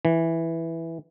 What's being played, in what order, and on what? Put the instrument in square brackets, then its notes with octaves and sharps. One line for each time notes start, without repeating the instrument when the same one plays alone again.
[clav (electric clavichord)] E3